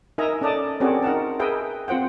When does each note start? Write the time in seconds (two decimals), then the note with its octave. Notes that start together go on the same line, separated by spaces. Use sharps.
0.18 D#4 A#4 D#5 E5 G#5 A#5
0.41 C#4 A4 D5 D#5 A5
0.80 C4 C#4 F#4 G#4 A#4 D5
1.03 D#4 A#4 F#5 A5
1.40 G#4 A#4 B4 D#5 E5 G5
1.88 C4 F4 C5 F#5 G5